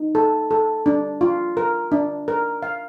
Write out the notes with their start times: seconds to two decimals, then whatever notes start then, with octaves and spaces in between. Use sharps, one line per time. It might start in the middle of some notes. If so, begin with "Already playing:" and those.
Already playing: D#4
0.15 A4
0.51 A4
0.86 D4
1.21 F4
1.57 A#4
1.92 D4
2.28 A#4
2.62 F5